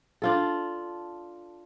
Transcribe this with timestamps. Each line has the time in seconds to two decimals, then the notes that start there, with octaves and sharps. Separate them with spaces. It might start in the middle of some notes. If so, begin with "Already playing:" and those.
0.22 D4 F4 A4